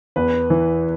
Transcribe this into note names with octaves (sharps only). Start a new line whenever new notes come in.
E2 B4
E3